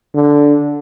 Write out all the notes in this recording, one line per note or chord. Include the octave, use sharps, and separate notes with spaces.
D3